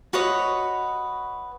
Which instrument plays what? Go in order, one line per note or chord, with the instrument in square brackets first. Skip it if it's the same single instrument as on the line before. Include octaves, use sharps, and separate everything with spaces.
[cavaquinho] F#4 B4 C#5 D#5